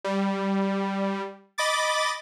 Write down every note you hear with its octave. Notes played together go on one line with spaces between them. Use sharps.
G3
D#5 B5 D6 A6